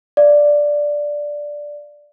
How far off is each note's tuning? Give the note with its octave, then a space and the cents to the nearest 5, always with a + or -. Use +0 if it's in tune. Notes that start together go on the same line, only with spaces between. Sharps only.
D5 +0 F5 +0